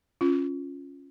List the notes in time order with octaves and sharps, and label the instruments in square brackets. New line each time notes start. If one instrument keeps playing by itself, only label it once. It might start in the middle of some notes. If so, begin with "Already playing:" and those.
[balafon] C#4 F4